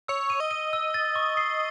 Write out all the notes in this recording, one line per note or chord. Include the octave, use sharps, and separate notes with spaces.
C#5 E6
D#7
D#5
D#7
E6
A6
C#6
C7